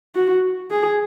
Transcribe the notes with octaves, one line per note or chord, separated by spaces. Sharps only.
F#4
G#4